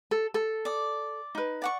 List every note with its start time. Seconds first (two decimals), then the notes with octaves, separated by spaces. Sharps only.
0.11 A4
0.34 A4
0.65 D5 D#6
1.35 D#4 B4
1.62 D5 F#5 C#6